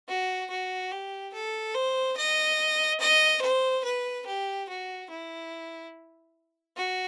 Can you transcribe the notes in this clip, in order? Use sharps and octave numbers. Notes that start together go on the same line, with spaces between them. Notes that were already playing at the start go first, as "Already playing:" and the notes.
F#4
F#4
G4
A4
C5
D#5
D#5
C5
B4
G4
F#4
E4
F#4